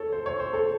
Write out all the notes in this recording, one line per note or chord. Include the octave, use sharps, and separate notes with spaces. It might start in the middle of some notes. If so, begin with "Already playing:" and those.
Already playing: A4 C#5
C5
C#5
C5
A4